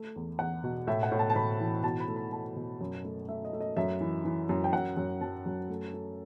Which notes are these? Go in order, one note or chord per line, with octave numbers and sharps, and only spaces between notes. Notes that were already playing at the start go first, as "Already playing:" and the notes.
Already playing: A3
E2
E2 F#5
B2
A2 E5
F#5
A2
A5
A5
A2 B5
E3
B2 A5
B5
A3
B5
A3 A5
B2
F#2
A3
A3 E5
D#5
A3
D#5
F#2 E5
E3
E3
F#2
G5
F#2 F#5
F#2
F#3 A5
F#2
A3
A3